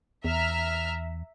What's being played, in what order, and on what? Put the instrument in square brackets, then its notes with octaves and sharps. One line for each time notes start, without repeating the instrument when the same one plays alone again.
[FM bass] E2 [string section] E5 A#5 F6